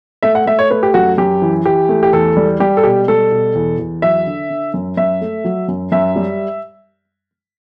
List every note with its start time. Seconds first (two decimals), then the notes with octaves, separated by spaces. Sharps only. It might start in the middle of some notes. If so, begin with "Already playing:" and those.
0.23 A3 E5
0.35 F#5
0.46 A3 E5
0.59 C#5
0.71 A3 B4
0.83 G4
0.94 F#2 F#4
1.18 F#2 G4
1.42 E3
1.65 E3 G4
1.89 A3
2.03 G4
2.13 E2 A4
2.37 G3
2.60 G3 G4
2.77 A4
2.83 B2 G4
3.08 G3 A4
3.32 B2
3.55 E2
3.79 E2
4.02 F#3 E5
4.26 D3
4.50 D3
4.74 F#2
4.97 F#2 E5
5.22 A3
5.45 F#3
5.68 F#2
5.92 F#2 E5
6.16 G3